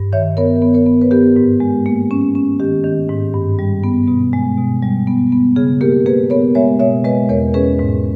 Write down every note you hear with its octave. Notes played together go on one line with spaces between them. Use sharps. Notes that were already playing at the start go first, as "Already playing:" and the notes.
Already playing: G2
D#3 C#5 E5
B3 A#4 C#5
B3
A#4 C#5
B3
B4
B3 G4 A#4
G#2
G#3
A#3
C#4
C#4
D#3 G4
D#3
G#2
G2
G3
B3
B2
G#3
B2
G3
B3
B3
C#3 G#4
A#3 G4 A#4
A#3 G#4 B4
B3 A#4 C#5
G#3 C#5 E5
B2 C#5 E5
G#3 B4 D#5
E2 A#4 C#5
C#4 G#4 B4
G#2